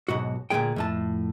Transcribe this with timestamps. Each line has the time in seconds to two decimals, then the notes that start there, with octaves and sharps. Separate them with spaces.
0.08 B1 G#2 F#4
0.50 D2 A#2 D#3 G#3 G#4 G5
0.76 F2 A2 A5